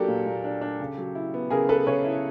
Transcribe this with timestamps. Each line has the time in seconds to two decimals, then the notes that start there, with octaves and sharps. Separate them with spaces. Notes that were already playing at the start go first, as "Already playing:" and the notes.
Already playing: F#3 A#3 D4 G4 A4 A#4
0.08 A#2
0.26 A#2
0.44 D4
0.62 D4
0.80 C#3
0.98 F#3
1.15 E4
1.34 B3
1.50 C#3 G#4 A#4
1.69 B3 A4 B4
1.87 C#3 B4 C#5
2.04 E4